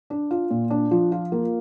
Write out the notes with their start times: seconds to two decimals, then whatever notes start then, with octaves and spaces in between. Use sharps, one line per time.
0.10 D4
0.31 F4
0.50 A#2
0.70 D4
0.91 F3
1.12 F4
1.32 A#3